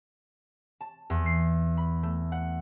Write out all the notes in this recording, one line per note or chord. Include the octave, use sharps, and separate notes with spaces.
A5
E2
C7
B5
A3
F#5